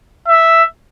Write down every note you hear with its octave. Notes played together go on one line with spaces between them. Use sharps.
E5